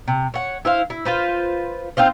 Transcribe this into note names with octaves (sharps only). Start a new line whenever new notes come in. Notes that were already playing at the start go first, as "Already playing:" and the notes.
C3
C#5 F#5
E4 C5 F5
E4
F4 B4 C5
C4 D#4 F4 C5